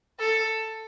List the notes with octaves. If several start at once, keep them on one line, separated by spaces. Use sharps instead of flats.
A4